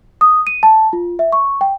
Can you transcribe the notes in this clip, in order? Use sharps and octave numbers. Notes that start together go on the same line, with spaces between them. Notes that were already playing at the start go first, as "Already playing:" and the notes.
D#6
D#7
A5
F4
E5
C#6
G5